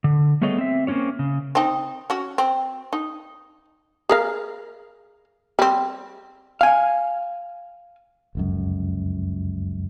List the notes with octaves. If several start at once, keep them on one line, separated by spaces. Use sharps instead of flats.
D3
G3 A3 B3 G#4 C#5 D#5
C4 E5
A#3 C4 C#4 F4 C#5
C#3
C4 D#4
C#4 F#4
C4
D#4
G#4 A#4 F5
G3 C4
F5 G#5
F1 C#2 F#2